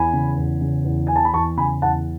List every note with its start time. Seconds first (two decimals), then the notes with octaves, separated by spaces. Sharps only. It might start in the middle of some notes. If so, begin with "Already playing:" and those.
Already playing: E2 G#5 B5
0.13 C#3
0.37 E2
0.61 C#3
0.85 E2
1.07 E3 G#5
1.16 A5
1.25 B5
1.34 E2 A5 C#6
1.57 C#3 G#5 B5
1.82 E2 F#5 A5